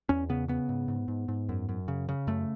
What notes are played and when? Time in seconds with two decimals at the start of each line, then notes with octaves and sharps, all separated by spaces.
0.09 E2 C#4
0.29 C#3 B3
0.48 C#3 B3
0.69 G#2
0.88 G#2
1.08 G#2
1.28 G#2
1.49 F#2
1.69 F#2
1.88 C#3
2.09 C#3
2.27 F#2 A3